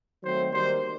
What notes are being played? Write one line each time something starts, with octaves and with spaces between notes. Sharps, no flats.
D#3 F#3 A3 C4 C5
D#3 G3 A#3 C5